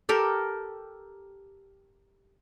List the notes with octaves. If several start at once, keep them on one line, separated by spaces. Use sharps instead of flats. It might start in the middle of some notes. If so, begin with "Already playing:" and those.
G4 A4 A#4